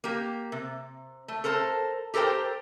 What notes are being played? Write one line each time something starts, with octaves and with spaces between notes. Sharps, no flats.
A#3 G4
C3
A3
A4 A#4 C5 A5
G4 A4 A#4 C5 G5